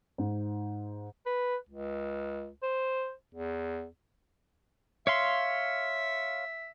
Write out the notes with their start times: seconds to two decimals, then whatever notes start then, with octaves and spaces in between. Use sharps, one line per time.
0.18 G#2
1.26 B4
1.69 C#2
2.63 C5
3.35 E2
5.07 C#5 E5 F5 C6